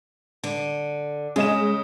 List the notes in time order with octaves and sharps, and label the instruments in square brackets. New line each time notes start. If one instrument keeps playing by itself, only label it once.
[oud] D3
[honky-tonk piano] C#3 D#5 E7 [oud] G#3